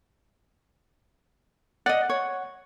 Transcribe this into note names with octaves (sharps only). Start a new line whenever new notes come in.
D5 D#5 F#5
C#5